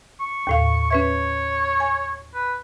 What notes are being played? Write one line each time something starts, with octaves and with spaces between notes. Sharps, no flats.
C#6
D#2 A2 F5
C#4 B4 C#5 E5
G#5
B4